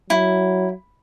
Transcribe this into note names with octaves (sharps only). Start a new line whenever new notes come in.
F#3 E4